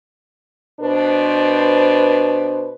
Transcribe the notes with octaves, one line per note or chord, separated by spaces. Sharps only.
B2 D4 B4 C5